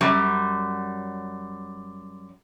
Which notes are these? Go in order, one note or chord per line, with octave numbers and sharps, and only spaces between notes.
F#2 G3